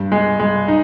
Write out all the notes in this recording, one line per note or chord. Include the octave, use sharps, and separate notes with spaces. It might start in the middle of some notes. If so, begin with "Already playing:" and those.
Already playing: G2
G#3
G#3
D#4